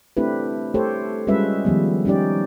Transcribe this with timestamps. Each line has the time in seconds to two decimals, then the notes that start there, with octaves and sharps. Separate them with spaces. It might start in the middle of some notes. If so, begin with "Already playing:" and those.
0.17 A3 C4 D4 E4 G4 B4
0.74 A3 G4 A4 C5 C#5
1.27 G3 G#3 C#4 F4 B4 E5
1.65 D#3 F3 G3 B3
2.05 G3 C#4 D#4 G4 D5